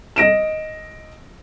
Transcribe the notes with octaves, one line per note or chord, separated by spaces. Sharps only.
D#5 A#6 D7 E7